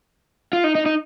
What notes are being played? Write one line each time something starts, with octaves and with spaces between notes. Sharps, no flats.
F4
D#4
D#4
D#4